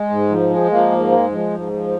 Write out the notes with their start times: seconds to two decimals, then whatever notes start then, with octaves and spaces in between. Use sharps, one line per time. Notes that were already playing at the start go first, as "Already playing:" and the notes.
Already playing: G#3
0.10 G#2
0.29 F3
0.50 G#3
0.71 F3 A#3
0.91 G#2
1.11 G#3
1.31 F3
1.52 G#2
1.72 F3